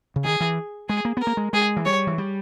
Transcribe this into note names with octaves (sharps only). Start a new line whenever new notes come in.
C#3
D#3 G#4
E3
G#3 G#4
A#3
B3 A#4
A#3
G#3
G#3 G#4
E3
G3 C#5
E3
G3